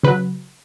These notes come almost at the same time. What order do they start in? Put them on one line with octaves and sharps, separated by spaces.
C#3 B4 F#3